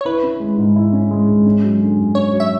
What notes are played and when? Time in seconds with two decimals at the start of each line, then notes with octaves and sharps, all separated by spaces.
0.01 C#5
0.05 E4 B4
0.23 C#4
0.40 G#3
0.58 G#2
0.76 E4
0.92 C#4
1.11 G#3
1.28 G#2
1.46 C#4
1.64 F#3
1.80 D3
1.98 F#2
2.15 C#4 C#5
2.33 F#3
2.40 E5